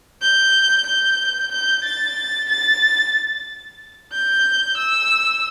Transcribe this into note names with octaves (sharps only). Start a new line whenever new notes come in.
G6
G6
G6
A6
A6
G6
E6